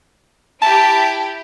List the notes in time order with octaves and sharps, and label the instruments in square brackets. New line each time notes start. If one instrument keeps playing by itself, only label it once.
[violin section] E4 G4 [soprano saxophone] A5